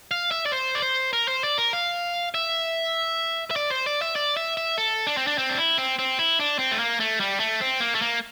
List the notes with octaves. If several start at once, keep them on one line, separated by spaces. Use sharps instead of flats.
F5
E5
D5
C5
D5
C5
A#4
C5
D5
A#4
F5
E5
E5
D5
C5
D5
E5
D5
E5
E5
A4
D4
C4
D4
C4
D4
E4
C4
C4
E4
D4
C4
A3
A#3
A3
G3
A3
C4
A#3
A3
A#3